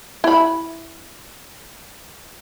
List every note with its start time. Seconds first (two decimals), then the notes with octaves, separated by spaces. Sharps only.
0.24 E4 B5